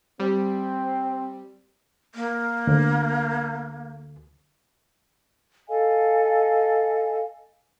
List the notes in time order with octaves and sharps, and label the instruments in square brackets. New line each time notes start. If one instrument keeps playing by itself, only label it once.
[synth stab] G3 [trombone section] C4
[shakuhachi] A#3
[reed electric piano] D2
[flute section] A4 D#5 F5 G#5